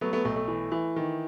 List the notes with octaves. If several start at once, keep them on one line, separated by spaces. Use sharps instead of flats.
F#3 A3 B3
A3 B3
B1 A3
A3
E3
E3
D#3